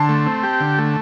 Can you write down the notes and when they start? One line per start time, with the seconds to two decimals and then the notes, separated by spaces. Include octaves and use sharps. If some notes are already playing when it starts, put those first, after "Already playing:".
Already playing: D3 A5 C6
0.09 A3
0.26 C4
0.43 G4
0.61 D3
0.78 A3